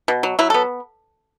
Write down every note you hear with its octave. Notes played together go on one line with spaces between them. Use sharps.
B2
F#3
F#3 E4
B3 A4